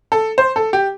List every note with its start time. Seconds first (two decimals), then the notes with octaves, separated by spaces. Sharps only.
0.12 A4
0.38 C5
0.56 A4
0.73 G4